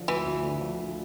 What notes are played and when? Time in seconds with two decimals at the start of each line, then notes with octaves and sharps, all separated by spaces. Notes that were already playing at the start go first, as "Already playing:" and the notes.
Already playing: D3 F3
0.08 D2 E3
0.25 D2
0.43 D3
0.61 F3
0.79 D2